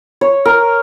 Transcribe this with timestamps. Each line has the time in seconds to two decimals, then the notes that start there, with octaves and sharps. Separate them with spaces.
0.21 C#5
0.45 A#4